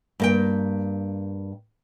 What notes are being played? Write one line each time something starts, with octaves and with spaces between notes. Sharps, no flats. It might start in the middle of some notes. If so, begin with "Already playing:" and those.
G2 A#3 G5